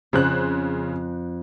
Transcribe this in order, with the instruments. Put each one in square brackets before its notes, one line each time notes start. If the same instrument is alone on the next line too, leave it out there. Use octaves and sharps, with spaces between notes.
[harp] F2 [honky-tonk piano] C#3 C5 F#6